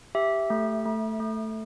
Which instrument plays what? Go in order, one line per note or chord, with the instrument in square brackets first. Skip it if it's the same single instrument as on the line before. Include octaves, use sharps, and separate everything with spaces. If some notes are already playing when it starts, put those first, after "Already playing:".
[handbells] G4 E5
A3
A3
A3